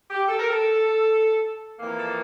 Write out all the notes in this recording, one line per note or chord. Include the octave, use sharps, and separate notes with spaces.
G4
A4
A#4
A4
F2 E3 A#3
A4